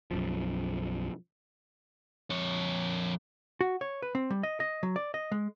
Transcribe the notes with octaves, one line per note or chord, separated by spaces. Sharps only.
B1 F#2 F3
F2 C#5
F#4
C#5
B4
C4
G3
D#5
D#5
F#3
D5
D#5
G#3